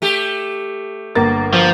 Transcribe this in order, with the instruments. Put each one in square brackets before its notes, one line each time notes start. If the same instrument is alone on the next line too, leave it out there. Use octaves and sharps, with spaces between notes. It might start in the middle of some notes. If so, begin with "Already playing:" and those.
[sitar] A3 G4
[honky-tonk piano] G1 A#3 A6
[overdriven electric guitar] F3